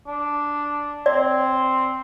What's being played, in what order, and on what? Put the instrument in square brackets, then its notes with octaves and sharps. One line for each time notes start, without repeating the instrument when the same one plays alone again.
[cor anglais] D4
[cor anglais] C4 [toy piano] D5